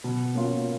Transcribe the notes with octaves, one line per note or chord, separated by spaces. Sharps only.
B2
A#3 C#4 F4